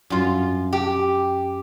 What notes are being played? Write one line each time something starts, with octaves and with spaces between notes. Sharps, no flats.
F#2 F4
G4